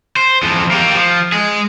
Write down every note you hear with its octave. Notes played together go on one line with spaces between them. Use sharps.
C5
E2 F3
A#3 G4
F3
G#3 G#4